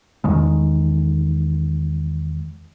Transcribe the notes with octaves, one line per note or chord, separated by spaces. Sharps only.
E2 D#3 G#3